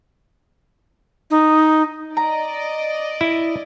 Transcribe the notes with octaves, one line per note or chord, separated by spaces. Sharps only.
D#4
D5 D#5 A#5
E4